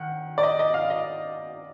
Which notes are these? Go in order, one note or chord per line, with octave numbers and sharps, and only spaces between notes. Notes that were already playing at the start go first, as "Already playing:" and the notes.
Already playing: D#3 F#5
D5
D#5
D#5
F5
D#5